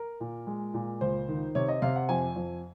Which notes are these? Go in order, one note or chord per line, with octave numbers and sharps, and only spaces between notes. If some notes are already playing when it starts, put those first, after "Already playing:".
Already playing: A#4
A#2
G#3
A#2
C#2 C5
D#3
C3 C#5
D#5
C3 F5
F#5
F2 G#5
F2